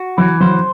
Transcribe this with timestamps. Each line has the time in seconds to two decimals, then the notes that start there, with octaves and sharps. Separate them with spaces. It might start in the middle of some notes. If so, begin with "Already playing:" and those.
Already playing: F#4
0.18 E3 F#3
0.40 F#3 C5